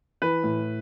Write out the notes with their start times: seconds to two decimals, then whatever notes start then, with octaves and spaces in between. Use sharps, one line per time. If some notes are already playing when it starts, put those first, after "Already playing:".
0.22 E3 B4
0.44 A2